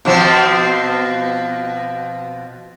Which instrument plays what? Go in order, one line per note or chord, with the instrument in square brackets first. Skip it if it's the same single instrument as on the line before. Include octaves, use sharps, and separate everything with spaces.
[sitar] B2 F3 C4